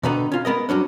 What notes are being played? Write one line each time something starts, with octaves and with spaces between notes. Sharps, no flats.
B2 D3 D#3 B3 D#4
C#4 F4
G#3 B3 A#4 D#5
G2 F#3 C#4 D4